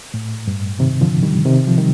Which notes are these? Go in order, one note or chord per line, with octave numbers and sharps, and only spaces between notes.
A2
G2
C3 D#3
D3 F3
D#3 G3
C3 D#3
F3
D#3 G3